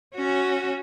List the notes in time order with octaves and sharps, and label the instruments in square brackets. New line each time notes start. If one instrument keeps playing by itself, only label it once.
[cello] C#4 F#4